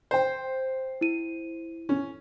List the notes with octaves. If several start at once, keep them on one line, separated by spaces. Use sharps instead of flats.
C5 G5
E4 D#7
C#4